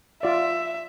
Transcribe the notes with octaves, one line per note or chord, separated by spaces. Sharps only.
F4 D5 E5